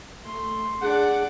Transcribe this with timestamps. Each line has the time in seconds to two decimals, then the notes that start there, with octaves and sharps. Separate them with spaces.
0.22 A3 C6
0.82 D4 G#4 D5 F#5